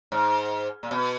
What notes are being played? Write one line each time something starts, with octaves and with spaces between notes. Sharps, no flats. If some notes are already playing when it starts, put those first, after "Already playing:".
G#2
A#2
B2